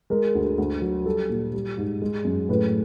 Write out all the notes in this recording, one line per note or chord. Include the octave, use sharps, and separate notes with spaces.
G#3 A#4
D2
D2
F#3
G3 A4
A#2
G3
G#2
G#3
F#2
A2 B4